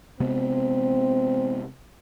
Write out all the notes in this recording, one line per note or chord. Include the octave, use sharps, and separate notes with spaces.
C3 G#3 B3 C4